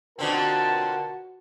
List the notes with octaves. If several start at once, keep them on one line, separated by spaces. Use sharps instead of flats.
B2 D3 C4 F4 F#4 A#4 A5